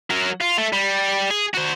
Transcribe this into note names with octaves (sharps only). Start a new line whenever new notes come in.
F#3 A#4
F4
A3
G3
G#4
F#4 C5